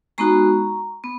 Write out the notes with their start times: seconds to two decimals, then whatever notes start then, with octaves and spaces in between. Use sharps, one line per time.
0.18 G#3 B3 D#4 F#4 A#5 C#6
1.04 B3